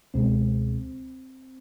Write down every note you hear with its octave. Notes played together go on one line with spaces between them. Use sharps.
C#2 B2 G#3 C4